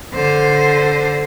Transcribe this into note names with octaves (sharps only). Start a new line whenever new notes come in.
D3 C5